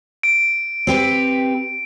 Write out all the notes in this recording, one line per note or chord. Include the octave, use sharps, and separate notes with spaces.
D7
C4 G4 B4